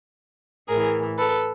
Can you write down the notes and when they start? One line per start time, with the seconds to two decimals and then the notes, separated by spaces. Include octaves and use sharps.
0.68 A2 E3 G#4 A#4
1.18 A4 B4